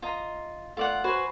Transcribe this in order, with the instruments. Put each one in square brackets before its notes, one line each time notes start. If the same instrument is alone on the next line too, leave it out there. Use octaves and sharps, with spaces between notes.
[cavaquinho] F4 D#5 A#5
[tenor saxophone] A3 [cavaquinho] F4 D5 F#5
[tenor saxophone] F#4 [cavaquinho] B4 C5 G#5